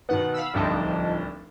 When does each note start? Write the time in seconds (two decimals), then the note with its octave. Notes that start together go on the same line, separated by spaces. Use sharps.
0.09 B2 D#3 B3 F#5
0.33 F5 B5 E6
0.54 D1 C2 F3 D4 D#4 A5